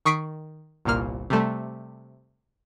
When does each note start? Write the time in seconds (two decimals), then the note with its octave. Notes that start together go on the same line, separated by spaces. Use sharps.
0.05 D#3 C#6 D#6 B6 C7 D7
0.85 G1 C2 A#2 A#3 F6
1.30 C3 G3 A3